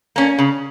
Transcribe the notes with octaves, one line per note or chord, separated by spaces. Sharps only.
A#3 C#4
C#3